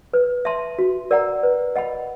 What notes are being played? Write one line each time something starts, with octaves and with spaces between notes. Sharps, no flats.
B4
E5 A5 C6
F#4
A#4 D5 F#5 A#5
B4
D#5 F#5 B5